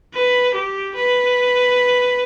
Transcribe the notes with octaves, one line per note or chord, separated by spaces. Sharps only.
B4
G4
B4